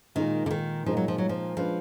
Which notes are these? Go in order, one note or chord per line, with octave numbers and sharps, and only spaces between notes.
A#2 D#3 G#3 D#4 A#4
D3
D#3
A#2 F3 G#3 D#4 A#4
F#3
F3
F#3
F3
F3 G#3 D4 F4 B4